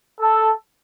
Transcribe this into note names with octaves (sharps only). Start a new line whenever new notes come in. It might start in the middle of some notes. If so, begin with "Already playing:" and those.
A4